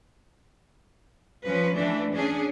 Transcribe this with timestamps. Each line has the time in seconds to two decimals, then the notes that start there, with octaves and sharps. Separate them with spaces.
1.43 F3 C#4 B4
1.74 E3 A3 D4
2.12 C#4 D4 G#4